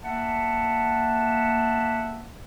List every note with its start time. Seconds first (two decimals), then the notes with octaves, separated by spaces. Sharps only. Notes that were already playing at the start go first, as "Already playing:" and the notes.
0.03 A#3 E5 F#5 A5